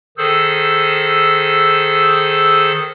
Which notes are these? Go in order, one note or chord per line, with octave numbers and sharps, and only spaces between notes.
D#3 G#4 A4 C5 E6